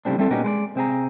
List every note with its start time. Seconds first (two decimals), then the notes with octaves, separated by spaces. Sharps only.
0.05 A2 C#3 F3 G3 C4 D4
0.18 G3 A3 C4 E4 A4
0.30 A#2 B3 C#4 D#4 F#4 G4
0.44 G#3 B4 D5
0.75 C3 C4 G#4 A#5